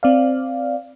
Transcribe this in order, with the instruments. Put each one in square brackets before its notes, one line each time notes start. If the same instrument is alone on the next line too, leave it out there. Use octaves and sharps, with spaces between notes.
[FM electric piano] C4 D5 F5